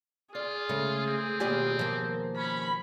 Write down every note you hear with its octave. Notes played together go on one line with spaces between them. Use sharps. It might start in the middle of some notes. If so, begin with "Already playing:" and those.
F4 G#4 D5
C#3 G#3 A3
C4
D#2 B2 F4 G4 D5 G#5
F3 A#3
C#4 B5